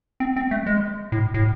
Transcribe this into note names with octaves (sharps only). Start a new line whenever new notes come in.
C4
C4
A3
G#3
A2
A2